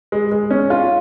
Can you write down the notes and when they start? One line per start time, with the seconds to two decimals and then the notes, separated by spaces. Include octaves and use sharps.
0.12 G#3
0.32 G#3
0.51 C#4
0.70 F4